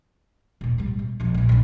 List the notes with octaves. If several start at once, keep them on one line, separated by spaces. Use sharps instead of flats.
D#1 B2
A1 G3
B2
B1 F2
A#2 E3
A#1 D#3